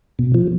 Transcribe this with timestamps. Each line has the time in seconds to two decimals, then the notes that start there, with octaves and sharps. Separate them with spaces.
0.19 B2
0.34 F3